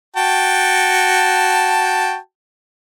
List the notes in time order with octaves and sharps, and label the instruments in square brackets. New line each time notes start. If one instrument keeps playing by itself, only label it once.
[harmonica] F#4 G5 A5